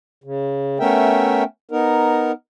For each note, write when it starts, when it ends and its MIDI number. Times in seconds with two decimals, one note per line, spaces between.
0.24 0.78 49
0.80 1.44 57
0.80 1.44 59
0.80 1.44 61
0.80 1.44 70
0.80 1.44 76
0.80 1.44 79
1.71 2.32 59
1.71 2.32 63
1.71 2.32 70